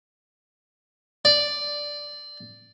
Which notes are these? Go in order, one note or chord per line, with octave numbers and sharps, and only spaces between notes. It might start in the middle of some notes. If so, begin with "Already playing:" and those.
D5